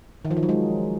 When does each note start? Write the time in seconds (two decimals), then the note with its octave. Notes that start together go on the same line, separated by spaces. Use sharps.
0.25 D#3
0.31 F3
0.37 D#3
0.43 F#3
0.49 G#3